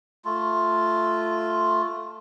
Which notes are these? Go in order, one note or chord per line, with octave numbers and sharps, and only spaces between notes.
A3 F4